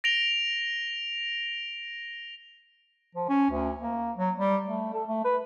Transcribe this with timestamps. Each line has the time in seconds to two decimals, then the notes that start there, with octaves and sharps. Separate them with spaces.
0.04 A#6 D7 F7 G7
3.15 F3
3.29 C#4
3.51 D2
3.81 A#3
4.17 F#3
4.37 G3
4.66 A3
4.94 A4
5.08 A3
5.24 B4